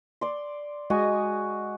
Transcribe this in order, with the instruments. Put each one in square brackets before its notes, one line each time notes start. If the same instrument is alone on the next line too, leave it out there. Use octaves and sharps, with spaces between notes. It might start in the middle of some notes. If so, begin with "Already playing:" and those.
[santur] D5 C6
[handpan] G#3 D#5 [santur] F#4 G#5